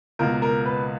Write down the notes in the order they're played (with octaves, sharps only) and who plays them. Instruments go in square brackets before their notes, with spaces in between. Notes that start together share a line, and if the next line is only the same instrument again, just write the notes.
[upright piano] C#2 B2 A#3 A#4
A#4
B4